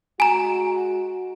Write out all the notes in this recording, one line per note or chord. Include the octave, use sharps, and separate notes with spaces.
G#3 F#4 G#5 A#5